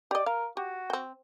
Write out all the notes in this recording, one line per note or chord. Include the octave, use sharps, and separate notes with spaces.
G4 D5 D#5
A#4 F5
F#4 G4
C4 G5